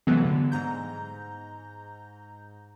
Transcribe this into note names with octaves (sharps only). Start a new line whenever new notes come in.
C3 E3 F#3 G#3 A3 B3
G2 D3
G#2 A#5 G6